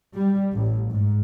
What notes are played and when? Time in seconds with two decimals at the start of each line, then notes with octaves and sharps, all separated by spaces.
0.15 G3
0.54 A1
0.91 G#2